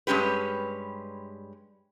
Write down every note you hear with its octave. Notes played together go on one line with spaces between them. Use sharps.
G2 G#3 C#4 G4 B4